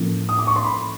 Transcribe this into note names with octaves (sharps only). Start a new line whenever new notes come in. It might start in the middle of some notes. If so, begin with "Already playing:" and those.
Already playing: A2 F3 A#3 C#4
D#6
D6
C#6
C6
B5